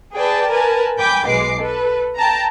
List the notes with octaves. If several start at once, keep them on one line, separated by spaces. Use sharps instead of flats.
G#4 B4 D5 G5 A5
A#4 B4 G#5 A5
G5 G#5 B5 D6 G6
B1 G#3 B4 D6 C7
A4 B4
G5 A5 A#5